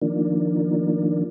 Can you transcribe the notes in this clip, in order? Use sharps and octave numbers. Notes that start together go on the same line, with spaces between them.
D#3 F3 A#3 D4